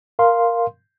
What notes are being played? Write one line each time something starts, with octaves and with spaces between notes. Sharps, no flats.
A#4 F5 C6